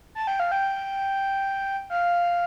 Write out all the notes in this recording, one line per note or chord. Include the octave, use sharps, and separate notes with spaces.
A5
G5
F5
G5
F5